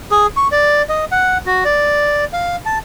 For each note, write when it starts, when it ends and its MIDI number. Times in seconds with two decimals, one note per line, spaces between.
0.11 0.27 68
0.37 0.48 85
0.52 0.82 74
0.89 1.05 75
1.12 1.38 78
1.46 1.64 66
1.65 2.25 74
2.33 2.56 77
2.66 2.79 81